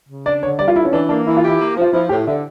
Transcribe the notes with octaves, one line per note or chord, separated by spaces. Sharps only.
C#3
D4 D5
D3 C#5
G3 D5
F4
D3 E4
C#4
E3 D4
A#3 D4
E3 E4
F4
E4 G4
A#3
F3
F4
F3 E4
A2 G4
D3 E5